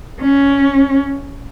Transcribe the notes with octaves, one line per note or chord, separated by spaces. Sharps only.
C#4